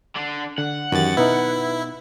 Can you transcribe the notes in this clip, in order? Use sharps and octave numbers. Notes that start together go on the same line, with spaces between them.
D3 D4
D3 F#5
F#2 D#3 E3 G4 A6
B2 B3 D#4 E4 B4 E5